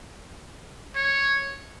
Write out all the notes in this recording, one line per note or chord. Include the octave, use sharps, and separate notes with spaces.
C#5